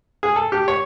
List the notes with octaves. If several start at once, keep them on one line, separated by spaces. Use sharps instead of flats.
G#4
A4
G4
C#5